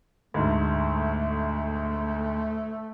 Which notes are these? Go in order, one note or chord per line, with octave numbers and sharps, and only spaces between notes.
D2 G#2 A3